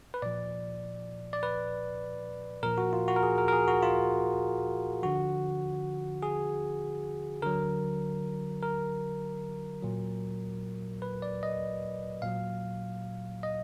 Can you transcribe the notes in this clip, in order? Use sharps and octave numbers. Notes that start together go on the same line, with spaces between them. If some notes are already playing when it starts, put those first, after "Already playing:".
B4
A#2 F3 D5
D5
B4
A#2 F3 A#4
F#4
F4
F#4
A#4
G#4
A#4
A#4
G#4
F#4
F4
D3 F3 F#4
G#4
D3 F#3 A#4
A#4
A#2 F#3
B4
D5
D#5
A#2 F#3 F5
D#5